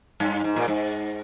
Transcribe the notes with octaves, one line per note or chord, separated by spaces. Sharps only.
G2
G#2
A#2
G#2